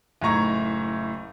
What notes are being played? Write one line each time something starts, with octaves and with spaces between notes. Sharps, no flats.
F#1 A2 D#4 A#5 C#6 G#6